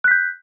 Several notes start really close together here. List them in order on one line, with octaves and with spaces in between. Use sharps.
F#6 B6 G6